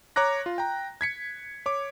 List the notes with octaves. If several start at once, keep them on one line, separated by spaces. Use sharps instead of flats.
C#5 A#5 D6 F#6 A#6
F4
G5 A#5
G#6 B6 C#7
C#5 D6